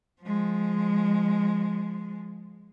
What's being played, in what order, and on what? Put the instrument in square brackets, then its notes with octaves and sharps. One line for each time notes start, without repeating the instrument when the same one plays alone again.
[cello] F3 G#3